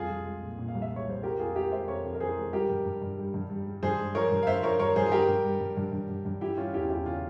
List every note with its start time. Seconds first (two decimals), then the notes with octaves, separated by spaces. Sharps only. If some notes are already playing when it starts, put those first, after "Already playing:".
Already playing: C2 F2 F4 G#4
0.10 C2
0.26 G#3
0.42 A#2
0.59 A#2
0.68 F5
0.75 C2
0.82 E5
0.91 G#3
0.96 C#5
1.07 C2 C5
1.23 G#3 G4 A#4
1.39 F2 F4 G#4
1.56 G#3 G4 A#4
1.72 G#3 C5 E5
1.88 F2 A#4 C#5
2.05 F2
2.15 A#4
2.20 E3 G#4 C5
2.37 G#3
2.53 G3 G4 A#4
2.69 G2
2.85 G2
3.02 G2
3.17 G3
3.34 G2
3.50 G3
3.66 G3
3.83 G2 G#4 C5
3.99 G#3
4.15 F3 A#4 C#5
4.31 G2
4.43 F5
4.47 G2 C5 E5
4.63 F3 A#4 C#5
4.79 G2 A#4 C#5
4.96 G2 G#4 C5
5.06 G#4
5.12 G3 G4 A#4
5.28 G2
5.44 G3
5.60 G2
5.77 G2
5.93 G2
6.09 G2
6.25 G2
6.41 E3 E4 G4
6.57 G3 C#4 F4
6.74 E2 E4 G4
6.90 E2 E4 G4
7.06 C#3 C#4 F4